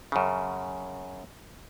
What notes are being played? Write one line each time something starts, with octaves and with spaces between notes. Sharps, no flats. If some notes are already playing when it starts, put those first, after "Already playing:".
F#2 C#3